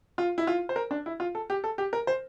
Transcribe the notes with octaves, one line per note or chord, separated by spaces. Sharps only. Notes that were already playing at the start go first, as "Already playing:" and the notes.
F4
E4
F4
C5
A#4
D4
E4
F4
A4
G4
A4
G4
A#4
C5